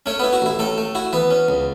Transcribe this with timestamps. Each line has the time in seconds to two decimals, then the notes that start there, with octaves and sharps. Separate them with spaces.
0.06 A3 C#4 C#5
0.19 B3 E4 B4
0.33 F#4
0.42 A1 E4
0.59 A2 A3 A4
0.78 A3
0.95 E4 F#4
1.13 E3 B3 B4
1.31 C#4
1.48 C#2